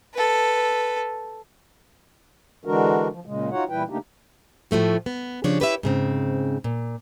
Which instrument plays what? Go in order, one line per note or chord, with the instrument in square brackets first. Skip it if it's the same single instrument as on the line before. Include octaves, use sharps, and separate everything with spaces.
[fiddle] A4 B4
[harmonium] D3 E3 G#3 D4 F#4 A#4
F3
A#2 C#3 G#3
D#4 F4 F#4 C#5 F#5
A#2 E3 G3 E4 B4 G5
C#3 A3 A#3 D4 D#4 G4
[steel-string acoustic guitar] A2 F3 A3 F#4
B3
C#3 F3 D4 G4 C#5
E4 G4 B4 C#5 D#5 E5
G#2 C#3 C4
A#2